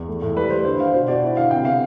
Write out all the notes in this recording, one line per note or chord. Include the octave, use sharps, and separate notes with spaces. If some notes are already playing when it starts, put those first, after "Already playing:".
Already playing: E2
A3
A2
G3 B4
G3 C5
D3 C5
D3 F5
B2 C5
B2 D5
E4
D3 F5
C3 G5
B3 F5